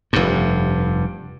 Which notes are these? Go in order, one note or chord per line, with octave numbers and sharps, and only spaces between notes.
F1 G2